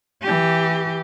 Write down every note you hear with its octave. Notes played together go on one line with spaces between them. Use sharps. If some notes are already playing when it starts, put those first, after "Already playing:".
E3 G4